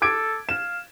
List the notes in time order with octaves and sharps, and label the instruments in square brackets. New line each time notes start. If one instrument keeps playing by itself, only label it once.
[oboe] A4 [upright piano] D6 G#6 D7
[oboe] F5 [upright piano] E7